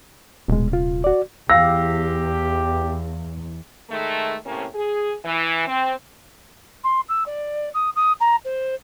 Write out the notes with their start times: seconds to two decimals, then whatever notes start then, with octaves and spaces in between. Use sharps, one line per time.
0.48 D#1 B2 G#3
0.72 C3 F4
1.04 F#4 D5
1.50 E2 G4 F5 E6 A#6
3.90 D#3 G#3 A3
4.45 A2 C3 A#3 C#4
4.74 G#4
5.24 E3
5.67 C4
6.84 C6
7.09 E6
7.26 D5
7.74 D#6
7.96 D#6
8.20 A#5
8.45 C5